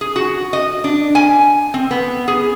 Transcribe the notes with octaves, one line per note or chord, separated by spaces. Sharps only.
G#4
F#4
D#5
D4
G#5
C4
B3
G#4